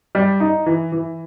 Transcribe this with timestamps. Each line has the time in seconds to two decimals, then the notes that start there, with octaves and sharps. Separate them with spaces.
0.15 G3
0.40 D#4
0.66 E3
0.92 E3